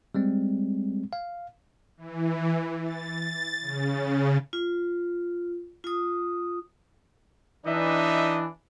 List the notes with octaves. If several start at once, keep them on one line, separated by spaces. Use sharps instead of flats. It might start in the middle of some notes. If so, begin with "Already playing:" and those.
G3 G#3 C4
F5
E3
A6
C#3
F4
F4 D#6
E3 D4 D#4 D#5 E5